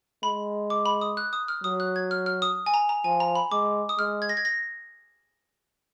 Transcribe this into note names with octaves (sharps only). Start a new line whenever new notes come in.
G#3 B5
D6
B5
D#6
F#6
D#6
F6
F#3 D#6
F#6
G#6
F6
F6
D#6
G#5
A#5
A#5
F3 G#5
A#5
B5
G#3 D6
D#6
G#3 F6
G#6
A#6
G#6
A#6